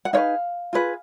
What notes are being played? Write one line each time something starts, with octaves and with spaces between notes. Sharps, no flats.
F#5
D#4 G#4 B4 C#5 F5
F4 G#4 B4